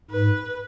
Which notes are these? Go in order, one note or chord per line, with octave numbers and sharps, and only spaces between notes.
G#2 B4